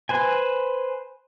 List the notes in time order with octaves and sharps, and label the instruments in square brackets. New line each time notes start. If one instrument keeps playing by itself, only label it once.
[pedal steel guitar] B4 C5 G#5